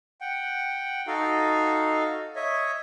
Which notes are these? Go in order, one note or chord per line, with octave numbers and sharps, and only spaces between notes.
F#5 G5
D#4 F#4 A4 D#5 F5
C#5 D#5 E5